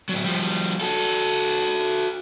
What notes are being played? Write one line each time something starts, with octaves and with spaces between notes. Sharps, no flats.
A2 F#3
F3 G3
F#4 A4